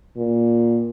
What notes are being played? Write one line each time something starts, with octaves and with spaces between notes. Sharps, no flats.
A#2